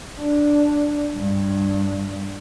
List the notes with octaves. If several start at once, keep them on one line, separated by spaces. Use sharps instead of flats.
D4
G2